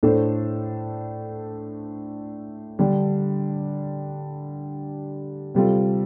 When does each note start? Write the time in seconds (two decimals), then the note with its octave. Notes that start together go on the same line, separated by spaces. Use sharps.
0.03 A2 A3 D4 A4 C5
2.79 D3 G3 D4
5.55 C3 G3 F4 A4